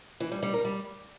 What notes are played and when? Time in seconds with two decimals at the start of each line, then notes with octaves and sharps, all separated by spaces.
0.20 E3
0.31 G3
0.43 G3
0.54 A#4
0.65 G3